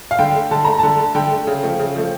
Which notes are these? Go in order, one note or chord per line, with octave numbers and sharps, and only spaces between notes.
F5
D3 G5
A3
D3 A5
A3 A#5
D3 A5
A3
D3 G5
A3
C#3
F3 A3
C#3
F3 A3